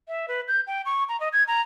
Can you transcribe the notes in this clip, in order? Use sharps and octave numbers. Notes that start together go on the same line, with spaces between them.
E5
B4
G6
G5
C#6
A#5
D#5
G#6
A#5